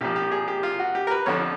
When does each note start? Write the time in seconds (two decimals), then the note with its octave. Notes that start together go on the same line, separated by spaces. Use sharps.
0.01 C2 A#2 F3 G4
0.16 G4
0.32 G#4
0.48 G4
0.63 F4
0.80 F#4
0.95 G4
1.07 A#4
1.11 B4
1.26 F2 D3 F3 C#5